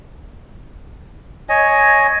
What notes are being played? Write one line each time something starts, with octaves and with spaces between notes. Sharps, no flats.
C#5 D#5 G#5